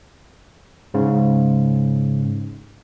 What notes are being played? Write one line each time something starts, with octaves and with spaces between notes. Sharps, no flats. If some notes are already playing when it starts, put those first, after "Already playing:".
G#2 C#3